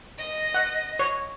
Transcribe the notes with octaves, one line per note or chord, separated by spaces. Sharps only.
D#5
F#5
C#5